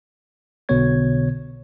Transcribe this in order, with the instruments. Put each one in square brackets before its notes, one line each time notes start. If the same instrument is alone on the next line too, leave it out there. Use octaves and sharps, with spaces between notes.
[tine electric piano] B1 B2 D3 B3 C#5 G#6